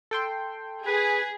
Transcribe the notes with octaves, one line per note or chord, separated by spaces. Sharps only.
A4 G5 C6
G#4 B4